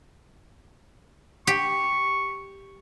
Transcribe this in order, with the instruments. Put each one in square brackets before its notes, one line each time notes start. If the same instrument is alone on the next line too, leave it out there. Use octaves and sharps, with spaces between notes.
[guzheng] G4 [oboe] C#6